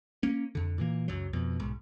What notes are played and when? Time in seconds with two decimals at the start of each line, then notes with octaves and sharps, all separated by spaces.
0.23 A#3 C#4
0.55 F2 D3
0.78 A#2 E3 A#3
1.08 C#2 F#2 F#3
1.33 F2 B2
1.60 B1 G#2